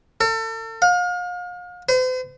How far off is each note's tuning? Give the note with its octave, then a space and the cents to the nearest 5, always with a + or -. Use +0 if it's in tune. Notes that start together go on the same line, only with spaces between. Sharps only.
A4 +40
F5 +35
C5 -45